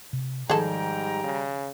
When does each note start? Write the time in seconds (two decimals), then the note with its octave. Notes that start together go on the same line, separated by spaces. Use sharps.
0.13 C3
0.50 G#2 D#3 F3 G3 G#4 A4 G5 A#5
1.23 C#3